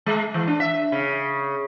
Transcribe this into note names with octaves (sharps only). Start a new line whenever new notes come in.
G#3
E3
D4
E5
C#3